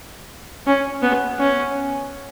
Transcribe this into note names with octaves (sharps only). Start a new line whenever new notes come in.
C#4
B3
C#4